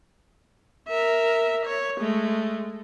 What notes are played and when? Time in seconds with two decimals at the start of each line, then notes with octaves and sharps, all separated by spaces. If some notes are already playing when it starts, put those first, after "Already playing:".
0.88 A#4 E5
1.66 C#5
2.01 G#3 A3